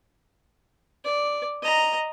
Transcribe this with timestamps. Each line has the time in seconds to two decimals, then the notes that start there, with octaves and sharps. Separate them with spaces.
1.05 D5
1.62 D#5 A#5